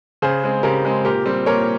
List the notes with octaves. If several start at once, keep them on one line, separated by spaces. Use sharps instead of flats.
C#3 G#4 C5
G#3 C4
C#3 G4 A#4
G#3 C4
A#2 G4 A#4
G3 C4
A#2 A#4 C#5